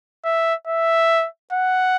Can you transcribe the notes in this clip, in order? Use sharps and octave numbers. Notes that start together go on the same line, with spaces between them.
E5
E5
F#5